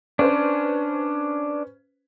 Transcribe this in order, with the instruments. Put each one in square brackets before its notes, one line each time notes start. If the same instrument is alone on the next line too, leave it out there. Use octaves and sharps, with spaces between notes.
[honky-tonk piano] C#4 B4 C5 [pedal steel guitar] D4